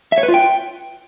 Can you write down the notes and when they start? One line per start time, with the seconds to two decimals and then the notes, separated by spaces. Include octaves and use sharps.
0.12 E5
0.18 C#5
0.23 B4
0.28 F4
0.34 G5